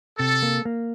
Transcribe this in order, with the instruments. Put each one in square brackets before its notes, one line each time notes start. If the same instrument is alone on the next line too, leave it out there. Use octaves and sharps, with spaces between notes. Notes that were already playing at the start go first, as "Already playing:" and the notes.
[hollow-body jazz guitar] C3 [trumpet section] A4
[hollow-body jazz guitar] A#3
A#3